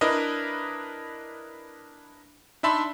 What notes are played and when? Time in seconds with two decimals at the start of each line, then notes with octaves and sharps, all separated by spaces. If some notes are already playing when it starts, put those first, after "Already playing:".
0.01 D4 E4 A#4 B4 D#5
2.63 D4 D#4 E5 A5 B5 C6